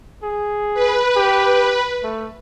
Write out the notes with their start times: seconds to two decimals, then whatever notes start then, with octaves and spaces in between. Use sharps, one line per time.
0.23 G#4
0.74 B4
1.16 G4
2.03 A3